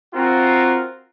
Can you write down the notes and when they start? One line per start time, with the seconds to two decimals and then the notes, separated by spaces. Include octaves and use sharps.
0.14 C4 F4 F#4 A#4